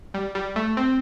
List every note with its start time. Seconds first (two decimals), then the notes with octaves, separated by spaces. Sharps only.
0.14 G3
0.35 G3
0.56 A3
0.77 C4